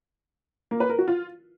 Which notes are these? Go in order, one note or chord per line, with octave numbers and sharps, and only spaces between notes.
A#3
B4
A#4
F#4
F4